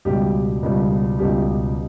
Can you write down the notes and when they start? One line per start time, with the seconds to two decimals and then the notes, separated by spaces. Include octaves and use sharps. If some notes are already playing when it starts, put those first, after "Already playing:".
0.05 C#2 B2 G3 G4
0.63 C#2 B2 G3
1.19 C#2 B2 G3 G4